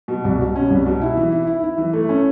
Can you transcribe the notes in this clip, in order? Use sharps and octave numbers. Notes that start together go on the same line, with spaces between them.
B2
C2
B2
C#4
C2
B2
E4
E3
E4
E4
E4
E3
A3
C#4